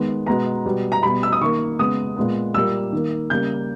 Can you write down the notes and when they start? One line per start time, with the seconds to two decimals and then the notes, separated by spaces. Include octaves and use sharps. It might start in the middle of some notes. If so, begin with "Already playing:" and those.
Already playing: D#3 G#3 B3
0.26 B2 G#3 B3 A#5
0.66 B2 G3 B3
0.92 A#5
1.03 B2 G3 B3 B5
1.23 E6
1.32 D#6
1.41 D#3 A#3 C#6
1.79 C#3 G#3 B3 D#6
2.16 A#2 G#3 B3
2.54 A#2 G3 A#3 E6
2.92 D#3 A#3
3.30 C#3 G3 A#3 G6